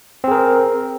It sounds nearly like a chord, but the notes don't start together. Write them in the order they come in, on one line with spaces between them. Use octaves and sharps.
C4 G#4 A#4